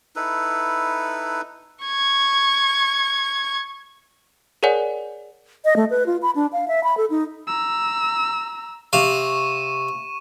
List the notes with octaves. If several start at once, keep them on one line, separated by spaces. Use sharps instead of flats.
D#4 E4 A4 B4
C#6 G#6
G#4 A#4 C#5 D5 F#5 G#5
D#5
A3
B4
F4
B5
D4
F5
E5
B5
A4
D#4
A#5 E6
C3 F5 C#6 D#7 E7